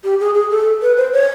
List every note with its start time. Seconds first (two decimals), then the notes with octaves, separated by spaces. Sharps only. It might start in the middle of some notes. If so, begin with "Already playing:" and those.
0.04 G4
0.20 G#4
0.35 G#4
0.51 A4
0.82 B4
0.97 C5
1.13 C#5